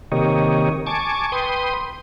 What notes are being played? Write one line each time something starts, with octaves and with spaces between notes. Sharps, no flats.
C3 D#3 A#3 G4 C#5 D#5
G#5 A5 C#6 D6
B4 G5 C6 D#6